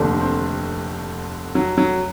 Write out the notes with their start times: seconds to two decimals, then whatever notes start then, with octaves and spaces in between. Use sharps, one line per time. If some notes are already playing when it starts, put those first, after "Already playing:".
Already playing: F1 D#2 D3
0.20 C4
1.55 F#3
1.78 F#3